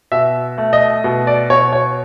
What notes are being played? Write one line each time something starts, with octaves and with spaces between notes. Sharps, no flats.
B2 E5
A3
D#5
B2
D5
B2 C#5
C#5